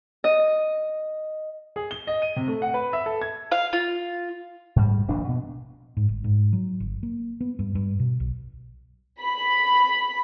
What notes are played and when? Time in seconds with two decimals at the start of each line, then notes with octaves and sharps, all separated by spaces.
0.24 D#5
1.76 G#4
1.91 G7
2.07 D#5
2.22 D#7
2.36 C3
2.48 A3
2.62 F#5
2.74 B4
2.93 E5
3.06 A4
3.22 G#6
3.52 F5
3.73 F4
4.76 G#2 G3
5.08 D#1 A#1 G2 D4
5.29 B2
5.97 G#2
6.09 G1
6.24 G#2
6.53 F#3
6.80 G1
7.03 A#3
7.41 B3
7.59 G2
7.75 G2
8.00 B2
8.20 B1
9.22 B5